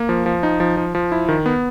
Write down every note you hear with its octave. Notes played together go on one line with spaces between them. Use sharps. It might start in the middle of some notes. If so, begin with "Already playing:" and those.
Already playing: A#3
F3
F3
D#4
F3
F3
F3
E4
D#3
B3